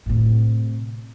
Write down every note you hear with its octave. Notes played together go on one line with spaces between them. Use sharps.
A2 C3